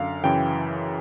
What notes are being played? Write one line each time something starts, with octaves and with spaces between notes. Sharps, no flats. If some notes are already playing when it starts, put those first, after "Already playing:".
Already playing: F#2 D3 F5
F#2 C#3 E3 G5